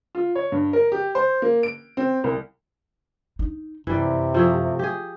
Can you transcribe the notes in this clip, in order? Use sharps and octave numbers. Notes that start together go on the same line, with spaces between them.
F4
C#5
G2
A#4
G4
C5
A#3
D7
C4
C2
D#4
F#2 C3 E3 G3 D5
F3 A3 G#4
G4 G#4